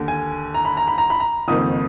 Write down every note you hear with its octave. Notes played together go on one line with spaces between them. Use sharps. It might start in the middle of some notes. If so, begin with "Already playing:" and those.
Already playing: D#2 D3
G#5
A#5
B5
A#5
B5
A#5
B5
A#5
F#1 F2 D#3 D#6